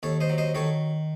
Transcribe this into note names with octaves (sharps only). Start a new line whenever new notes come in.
D#2 A4 C#5
C5 D#5
F#3
C5 D#5
D#3 A4 C#5